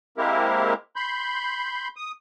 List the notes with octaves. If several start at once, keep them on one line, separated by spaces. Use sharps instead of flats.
G#3 A#3 C4 E4 G4 A#4
B5 C6 G6
D#6